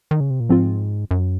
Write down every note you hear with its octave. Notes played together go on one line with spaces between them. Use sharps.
D#3
C#3
C3
A#2
G#2 F3 C4 F4
F#2